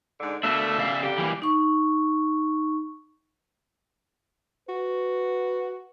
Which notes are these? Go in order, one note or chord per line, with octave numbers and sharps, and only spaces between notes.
G#2 D3
B2 A3 A#3 D4 E5
C#3 D5 F5
F2 D3 G4
E3 G3 A#3
D#4 C#6
F#4 B4